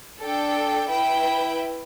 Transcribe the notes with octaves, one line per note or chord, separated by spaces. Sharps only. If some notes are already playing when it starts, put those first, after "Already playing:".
D4 A4 G5
E4 B4 G5